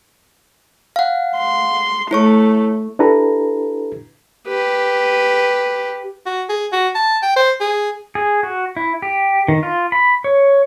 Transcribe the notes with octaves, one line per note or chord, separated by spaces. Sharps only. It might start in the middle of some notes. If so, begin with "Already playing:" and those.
F5 F#5
C6
A3 E4 C#5 C#6
D4 E4 G4 A4 B4 A#5
G4 B4
F#4
G#4
F#4
A5
G5
C5
G#4
G#4
F#4
E4
G4
D#3
F4
B5
C#5